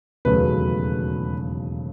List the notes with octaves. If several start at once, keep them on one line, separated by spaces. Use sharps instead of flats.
E1 D#2 C#3 F#3 A3 B4